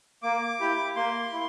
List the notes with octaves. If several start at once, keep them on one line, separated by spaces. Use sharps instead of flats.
A#3 D6
E4 G4
A#3 C6
E4